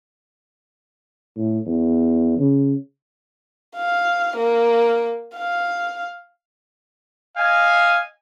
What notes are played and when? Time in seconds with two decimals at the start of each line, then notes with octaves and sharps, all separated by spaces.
1.37 A2
1.66 E2
2.39 C#3
3.77 F5
4.36 A#3
5.36 F5
7.37 D#5 F5 G#5